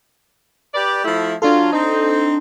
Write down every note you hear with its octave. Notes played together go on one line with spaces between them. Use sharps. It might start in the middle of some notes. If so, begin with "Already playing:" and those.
G4 B4 D5
F3 A3 E4
F#3 D4 F4 A4
C4 D#4